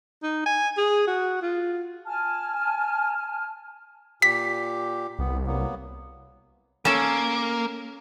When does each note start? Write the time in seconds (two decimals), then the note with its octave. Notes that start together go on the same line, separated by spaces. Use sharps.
0.23 D#4
0.46 G#5
0.77 G#4
1.07 F#4
1.42 F4
2.06 G#5 A5 F6
4.22 A#2 G4 B6
5.19 C2 B3
5.47 F#3 A#3 B3
6.85 A#3 C#4 A4